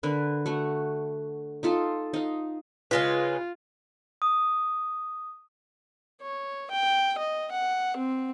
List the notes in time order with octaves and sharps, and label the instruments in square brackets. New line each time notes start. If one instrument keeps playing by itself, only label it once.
[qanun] D3 A#4 B4
A3 F#4
D#4 F4 A4
D#4 F5
[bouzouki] C#3 G#3 B4 [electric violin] F4
[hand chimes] D#6
[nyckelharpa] C#5
G5
D#5
F#5
C4